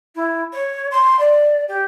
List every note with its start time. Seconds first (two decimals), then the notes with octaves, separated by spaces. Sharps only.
0.15 E4
0.53 C#5
0.91 C6
1.20 D5
1.68 G4